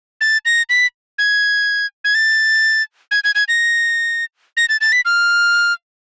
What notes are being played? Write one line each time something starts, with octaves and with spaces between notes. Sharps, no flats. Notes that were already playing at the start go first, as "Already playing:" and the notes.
A6
A#6
B6
G#6
G#6
A6
G#6
G#6
G#6
A#6
A#6
A6
A6
B6
F6